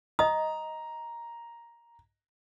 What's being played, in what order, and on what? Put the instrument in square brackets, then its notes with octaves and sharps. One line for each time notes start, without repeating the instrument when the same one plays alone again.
[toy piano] D#5 D#6 [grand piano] A#5